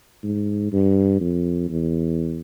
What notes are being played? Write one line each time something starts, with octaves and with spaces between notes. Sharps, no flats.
G#2
G2
F2
E2